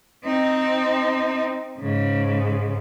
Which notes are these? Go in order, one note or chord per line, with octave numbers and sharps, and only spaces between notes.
C4 D#4
G#2 C#3